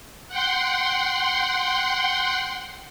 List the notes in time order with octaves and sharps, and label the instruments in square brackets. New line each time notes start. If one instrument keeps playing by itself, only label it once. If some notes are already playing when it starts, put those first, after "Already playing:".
[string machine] F#5 G5 C6